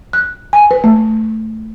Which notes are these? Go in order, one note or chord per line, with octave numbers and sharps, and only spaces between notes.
F#6
G#5
B4
A3